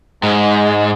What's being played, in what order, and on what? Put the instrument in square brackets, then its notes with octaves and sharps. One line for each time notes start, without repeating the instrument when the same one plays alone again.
[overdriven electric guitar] G#2 [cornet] G#3